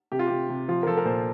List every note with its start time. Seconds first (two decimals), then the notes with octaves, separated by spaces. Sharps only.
0.12 C3 G4
0.19 F4
0.27 C3 G4
0.49 C3
0.68 F3 F4
0.83 A#4
0.86 F3 A4
0.97 A#4
1.05 A#2 C5